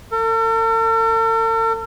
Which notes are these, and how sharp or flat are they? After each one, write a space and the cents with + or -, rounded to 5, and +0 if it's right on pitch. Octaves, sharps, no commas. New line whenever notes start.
A4 +45